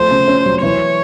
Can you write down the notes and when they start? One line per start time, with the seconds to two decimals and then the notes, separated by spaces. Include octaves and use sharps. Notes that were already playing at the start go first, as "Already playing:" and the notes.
Already playing: F3 A3 C5
0.11 C#3
0.28 C#4
0.46 F#3
0.62 E3 C#5